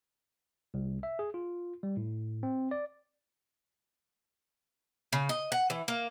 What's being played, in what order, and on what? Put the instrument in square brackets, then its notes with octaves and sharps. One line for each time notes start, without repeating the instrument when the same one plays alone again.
[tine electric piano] C2
E5
G#4
F4
G3
A2
C4
D5
[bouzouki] C#3
D#5
F#5
E3
A#3